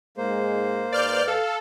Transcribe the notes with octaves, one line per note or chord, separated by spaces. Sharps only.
G#2 G#3 A#3 C5
G#2 B4 D5 F6 G6
A4 F5